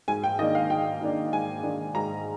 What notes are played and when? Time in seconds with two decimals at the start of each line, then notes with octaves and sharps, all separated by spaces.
0.08 G#2 G#5
0.24 G5
0.39 D#3 A#3 D4 D#5
0.55 F5
0.69 G#2 G5
1.01 D#3 A#3 D4
1.33 G#2 G#5
1.63 D#3 A#3 D4
1.95 G#2 A#5